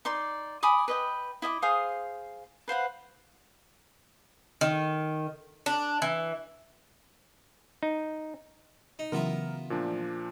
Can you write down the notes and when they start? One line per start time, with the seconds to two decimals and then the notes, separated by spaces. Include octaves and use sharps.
0.05 D#4 D5 C6
0.63 G#5 B5 D6 D#6
0.88 B4 D#5 G5
1.42 E4 D#5 E5 D6
1.62 G#4 C5 F5 D#6
2.68 B4 C5 F5 F#5
4.61 D#3
5.66 D4
6.02 E3
7.83 D#4
8.99 D#4
9.12 C#3 E3 F#3 B3 F4 A#4 E5
9.70 A#2 F3 D4